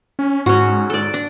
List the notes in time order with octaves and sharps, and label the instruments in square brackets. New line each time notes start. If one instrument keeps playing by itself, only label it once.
[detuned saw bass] C#4
[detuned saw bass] G#2 [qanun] C#4 F#4
[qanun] A4 D5
D4